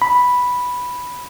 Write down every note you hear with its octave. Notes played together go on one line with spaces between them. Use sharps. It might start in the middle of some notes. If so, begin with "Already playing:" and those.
B5